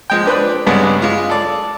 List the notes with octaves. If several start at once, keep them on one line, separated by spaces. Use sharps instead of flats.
F3 G#3 G5
D4 B4 C5 D5
G2 C#3 G#3 B3 D5
G#3 F4
A4 D5